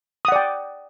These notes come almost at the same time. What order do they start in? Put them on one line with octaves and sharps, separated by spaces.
D#6 F#5 D5 G5